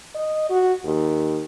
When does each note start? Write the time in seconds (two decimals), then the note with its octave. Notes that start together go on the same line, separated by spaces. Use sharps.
0.15 D#5
0.50 F#4
0.85 D#2